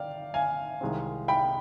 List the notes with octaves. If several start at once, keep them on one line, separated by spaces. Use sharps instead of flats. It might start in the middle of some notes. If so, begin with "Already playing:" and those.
Already playing: D5 F5 G5
F5 G#5
C2 C3 D#3 G#3 C4
G5 B5